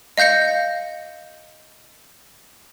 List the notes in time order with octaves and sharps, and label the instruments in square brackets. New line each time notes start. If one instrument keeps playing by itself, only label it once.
[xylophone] D#5 F5 G6 A#6 C#7